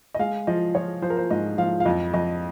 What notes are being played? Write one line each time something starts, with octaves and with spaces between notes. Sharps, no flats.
D#5
G#3 F5
F3 D#5
F3 C#5
F3 C5
A#4
C5
G#2 D#5
F3 F5
F5
F2 D#5
F2 D#5